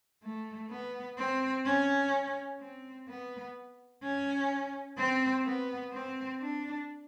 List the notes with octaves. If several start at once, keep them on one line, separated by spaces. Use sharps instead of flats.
A3
B3
C4
C#4
C4
B3
C#4
C4
B3
C4
D4